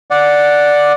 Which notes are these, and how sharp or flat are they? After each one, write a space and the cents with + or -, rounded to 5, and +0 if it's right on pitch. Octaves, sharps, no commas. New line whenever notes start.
D5 +0 F#5 -10